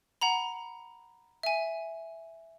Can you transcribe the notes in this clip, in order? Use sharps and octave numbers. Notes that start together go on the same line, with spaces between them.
F#5 A#5 B5
E5 G#5